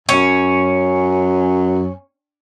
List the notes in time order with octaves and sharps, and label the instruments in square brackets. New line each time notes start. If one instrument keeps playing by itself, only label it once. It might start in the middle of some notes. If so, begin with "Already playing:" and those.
[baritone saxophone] F#2 [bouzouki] C#4